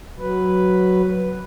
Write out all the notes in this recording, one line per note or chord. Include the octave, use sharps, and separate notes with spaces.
F#3 B4